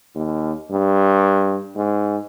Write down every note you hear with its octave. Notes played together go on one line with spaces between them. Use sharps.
D#2
G2
G#2